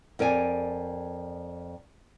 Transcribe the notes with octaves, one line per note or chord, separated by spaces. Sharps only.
F2 A#4 D5 G#5